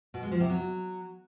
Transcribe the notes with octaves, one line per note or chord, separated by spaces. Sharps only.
B2
G#3
F3
C3
F#3